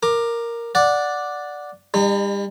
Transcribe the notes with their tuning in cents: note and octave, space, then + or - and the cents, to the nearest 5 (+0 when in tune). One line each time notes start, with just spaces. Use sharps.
A#4 +0 D6 +20
D5 +0 F#5 -10
G3 +35 D#4 -30